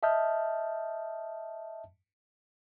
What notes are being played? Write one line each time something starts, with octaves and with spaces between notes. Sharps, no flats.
D#5 E5 A5 D#6 F6 G6